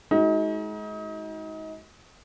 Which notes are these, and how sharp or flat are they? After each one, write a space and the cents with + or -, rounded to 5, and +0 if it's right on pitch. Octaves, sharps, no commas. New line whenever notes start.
G#3 +30 D#4 +35 F#4 +10